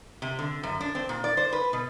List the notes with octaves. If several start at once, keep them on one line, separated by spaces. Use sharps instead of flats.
C3
D3
F#2
D4
C4
A#2
D5
C5
B4
B2